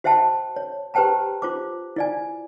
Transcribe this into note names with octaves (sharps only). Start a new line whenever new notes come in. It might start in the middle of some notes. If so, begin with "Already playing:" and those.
F#4 C5 E5 G5 A5
C#5
G4 B4 C5 G5 A5 A#5
F4 C5 D6
E4 D5 G#5